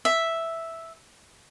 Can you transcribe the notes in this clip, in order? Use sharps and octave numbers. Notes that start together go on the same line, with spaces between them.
E5